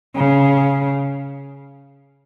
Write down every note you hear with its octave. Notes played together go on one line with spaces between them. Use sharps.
C#3